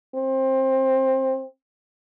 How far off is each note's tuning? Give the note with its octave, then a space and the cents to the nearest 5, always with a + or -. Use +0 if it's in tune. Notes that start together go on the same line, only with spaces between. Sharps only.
C4 +20